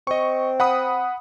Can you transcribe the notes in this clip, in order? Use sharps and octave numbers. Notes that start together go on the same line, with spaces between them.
C4 D#5 C#6
F#5 B5 D#6